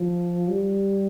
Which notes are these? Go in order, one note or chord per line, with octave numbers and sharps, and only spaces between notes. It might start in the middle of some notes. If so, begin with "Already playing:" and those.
Already playing: F3
G3